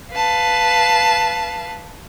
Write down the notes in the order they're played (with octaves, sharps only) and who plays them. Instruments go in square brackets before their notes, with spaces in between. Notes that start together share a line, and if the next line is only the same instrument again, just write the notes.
[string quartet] B4 F5 A5